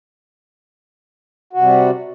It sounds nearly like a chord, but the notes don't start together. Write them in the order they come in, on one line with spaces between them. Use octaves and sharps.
F#4 C3 G3